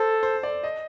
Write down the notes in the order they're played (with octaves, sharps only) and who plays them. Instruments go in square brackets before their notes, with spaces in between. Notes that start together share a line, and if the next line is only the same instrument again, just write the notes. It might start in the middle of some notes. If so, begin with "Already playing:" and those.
Already playing: [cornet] A4 [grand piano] C5
[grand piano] C5
D5
D#5